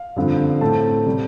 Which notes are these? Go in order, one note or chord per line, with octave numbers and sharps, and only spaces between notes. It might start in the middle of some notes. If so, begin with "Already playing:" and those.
Already playing: F5
G2 D3 F3 C4
A2 A3 C4 A5
C3 G3